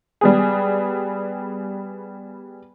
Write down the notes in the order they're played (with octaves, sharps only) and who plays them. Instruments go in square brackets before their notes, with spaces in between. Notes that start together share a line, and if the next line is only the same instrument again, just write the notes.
[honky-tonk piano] G3 B3 G#4